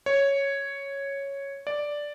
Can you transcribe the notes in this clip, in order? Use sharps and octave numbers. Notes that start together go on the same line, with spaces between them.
C#5
D5